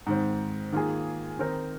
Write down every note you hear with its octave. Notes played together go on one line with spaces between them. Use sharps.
G#2 D#3 C4
D#3 A#3 F4 G#4
D#3 C4 D#4 A#4